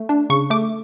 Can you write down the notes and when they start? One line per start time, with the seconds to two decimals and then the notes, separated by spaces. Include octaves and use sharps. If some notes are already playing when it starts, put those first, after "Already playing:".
Already playing: A3
0.09 D4
0.30 C#3 C#6
0.50 A3 D6